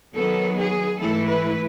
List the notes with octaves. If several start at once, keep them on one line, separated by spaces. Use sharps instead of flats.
D#3 F#3 B3 A4
G#4
G#2 E3 A3 E4 A4
B4